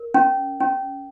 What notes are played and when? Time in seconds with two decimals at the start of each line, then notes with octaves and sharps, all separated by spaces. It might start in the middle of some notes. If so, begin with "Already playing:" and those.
Already playing: A#4
0.14 C#4
0.60 C#4